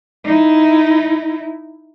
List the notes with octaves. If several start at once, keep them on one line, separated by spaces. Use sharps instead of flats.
D#4 E4